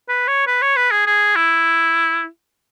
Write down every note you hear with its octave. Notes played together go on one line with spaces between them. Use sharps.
B4
C#5
B4
C#5
B4
G#4
G#4
E4